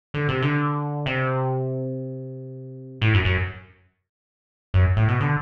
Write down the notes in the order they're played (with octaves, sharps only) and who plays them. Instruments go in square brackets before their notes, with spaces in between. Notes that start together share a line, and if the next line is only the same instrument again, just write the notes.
[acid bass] D3
C3
D3
C3
A2
F#2
F#2
F#2
A2
B2
D3